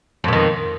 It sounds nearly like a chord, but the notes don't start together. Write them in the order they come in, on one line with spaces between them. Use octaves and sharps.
F2 B2 D#3